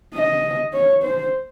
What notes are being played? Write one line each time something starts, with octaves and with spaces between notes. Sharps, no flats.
D#5
C#5
C5